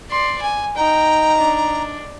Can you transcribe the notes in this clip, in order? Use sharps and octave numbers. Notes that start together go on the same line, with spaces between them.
D5 C6
G#5
D#4 G5 A#5
D4